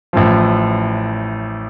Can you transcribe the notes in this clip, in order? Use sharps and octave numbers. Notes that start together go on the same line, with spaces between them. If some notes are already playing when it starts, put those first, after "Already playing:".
A1 A2 F3